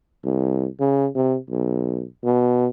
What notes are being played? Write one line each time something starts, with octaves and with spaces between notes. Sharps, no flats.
C2
C#3
C3
B1
B2